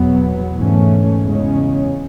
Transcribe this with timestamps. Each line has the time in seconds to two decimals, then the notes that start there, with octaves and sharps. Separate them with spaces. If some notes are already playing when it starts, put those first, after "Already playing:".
Already playing: E2 B2 F#3 B3
0.56 G#2 E3 A3 C#4
1.23 E2 C#3 G#3 C#4